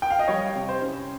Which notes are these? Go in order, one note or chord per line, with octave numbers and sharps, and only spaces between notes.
G5
F5
D#5
G3 C#5
C3
C5
C#4